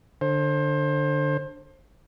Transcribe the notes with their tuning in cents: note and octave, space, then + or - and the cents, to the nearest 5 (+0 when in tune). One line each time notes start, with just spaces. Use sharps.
D3 +10 C5 +25